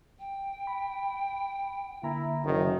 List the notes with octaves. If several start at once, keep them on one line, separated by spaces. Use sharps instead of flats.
G5
B5
D3 A#3 E4 A#5
F#1 D#3